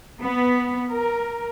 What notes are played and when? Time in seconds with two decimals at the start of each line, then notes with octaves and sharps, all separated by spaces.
0.21 B3
0.90 A#4